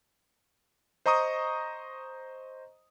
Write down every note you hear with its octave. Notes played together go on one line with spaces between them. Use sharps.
C5 D#5 A#5 C#6 D#6